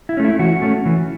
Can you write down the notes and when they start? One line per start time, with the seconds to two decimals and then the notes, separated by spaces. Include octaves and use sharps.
0.09 E4
0.17 A3 C#4
0.25 E4
0.39 E3 F#4
0.62 A3 C#4
0.86 E3